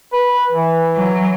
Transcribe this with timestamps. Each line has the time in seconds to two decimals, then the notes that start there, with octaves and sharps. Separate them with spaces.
0.13 B4
0.52 E3
0.96 F#3